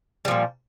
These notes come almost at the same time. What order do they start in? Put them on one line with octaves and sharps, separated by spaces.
G3 F3 A#2